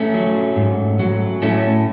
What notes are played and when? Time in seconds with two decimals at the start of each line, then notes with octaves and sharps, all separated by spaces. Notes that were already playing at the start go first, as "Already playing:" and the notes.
Already playing: A3 C#4
0.14 F#3
0.56 G#2
0.99 F#3
1.42 A2 A3 C#4